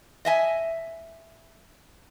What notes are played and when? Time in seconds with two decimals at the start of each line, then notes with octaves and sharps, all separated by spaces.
0.25 D#5 E5 G#5